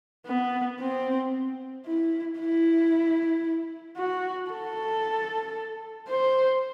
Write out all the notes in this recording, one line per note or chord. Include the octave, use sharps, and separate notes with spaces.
B3
C4
E4
E4
F#4
A4
C5